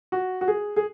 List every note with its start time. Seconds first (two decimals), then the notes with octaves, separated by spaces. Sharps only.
0.12 F#4
0.41 F#4
0.48 G#4
0.76 G#4